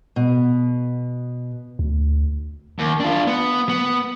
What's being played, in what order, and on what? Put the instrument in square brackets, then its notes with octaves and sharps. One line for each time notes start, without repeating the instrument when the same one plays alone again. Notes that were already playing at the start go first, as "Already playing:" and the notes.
[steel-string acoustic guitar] B2
[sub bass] D2
[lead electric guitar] D#2
D4 F4
B3
B3